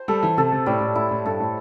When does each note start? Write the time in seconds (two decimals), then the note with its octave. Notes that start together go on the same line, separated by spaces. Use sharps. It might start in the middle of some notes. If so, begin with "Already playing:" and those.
Already playing: C5
0.08 G3 A4
0.23 E3
0.37 C3 A4
0.52 C3
0.66 A2 G3
0.81 A2
0.95 A2 E4
1.11 A2
1.25 G2 A4
1.40 A2